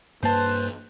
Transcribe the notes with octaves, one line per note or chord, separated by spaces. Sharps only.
G2 A#3 B4 C5 A5